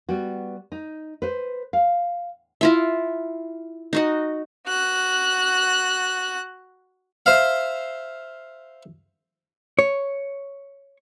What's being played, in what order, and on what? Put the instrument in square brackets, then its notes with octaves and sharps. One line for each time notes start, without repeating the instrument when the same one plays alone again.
[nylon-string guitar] G3 B3 F#4
D#4
B4 C5
F5
[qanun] E4 F4 E5
D#4 F#4 D#5
[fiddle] F#4 F#6
[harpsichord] C5 E5 F5
[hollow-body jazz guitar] C#5